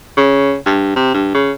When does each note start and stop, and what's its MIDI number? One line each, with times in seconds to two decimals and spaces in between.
0.17 0.56 49
0.66 0.95 43
0.96 1.13 48
1.14 1.32 43
1.34 1.52 49